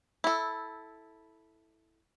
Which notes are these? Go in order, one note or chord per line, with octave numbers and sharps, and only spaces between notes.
E4 A4